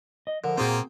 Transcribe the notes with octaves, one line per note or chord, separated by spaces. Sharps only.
D#5
D3 F3 A#4
A#2 A#3 C4 F4 F#4 G#4 C5 G5